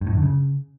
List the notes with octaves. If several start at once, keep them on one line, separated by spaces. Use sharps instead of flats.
G2
A2
F#2
D3
C#3